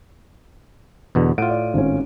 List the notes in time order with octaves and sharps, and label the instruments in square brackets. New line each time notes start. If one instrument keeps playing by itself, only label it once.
[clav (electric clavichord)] E2 B2 D3
[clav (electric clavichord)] A2 F4 [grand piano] F#5 D7 D#7
[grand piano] D5
G#1 C#4